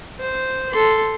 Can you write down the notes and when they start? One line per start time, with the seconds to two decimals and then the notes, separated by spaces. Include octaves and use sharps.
0.20 C5
0.71 A4 C6